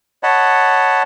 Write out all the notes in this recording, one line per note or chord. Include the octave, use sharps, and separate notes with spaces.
C#5 D#5 F#5 A5 B5